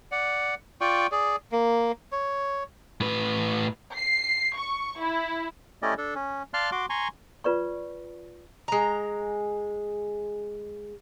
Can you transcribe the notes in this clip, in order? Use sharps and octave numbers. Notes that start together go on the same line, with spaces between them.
D5 F#5
F4 D5 G5 C#6
G#4 D5
A#3
C#5
A2 B4
C7
C#6
E4
A3 C#4 E4 G4 D5 D#5
D4 A4
C#4
D5 F5 A5 C6 F6 F#6
F#4 C6 D6
G#5 A#5 C6 C#6
F4 B4 D5 C#6
G#3 A#5